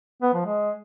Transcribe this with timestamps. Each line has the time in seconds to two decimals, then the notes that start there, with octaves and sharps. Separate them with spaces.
0.22 B3
0.34 F3
0.45 G#3